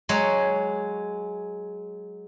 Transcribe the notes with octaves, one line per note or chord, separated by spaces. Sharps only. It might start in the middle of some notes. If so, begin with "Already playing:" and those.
F#3 G#3 G#4 C#5